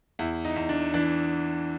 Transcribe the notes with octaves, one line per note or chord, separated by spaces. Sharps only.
E2 E4
D#4
E2
D4
E3 D4